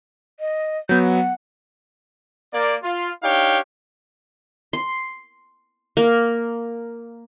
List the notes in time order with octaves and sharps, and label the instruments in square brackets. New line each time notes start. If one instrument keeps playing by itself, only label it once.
[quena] D#5
[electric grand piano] F#3 B3 [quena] G6
[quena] F#5
[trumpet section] A#3 D5
F4
D4 D#4 G4 C#5 F5 G5
[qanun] C6
A#3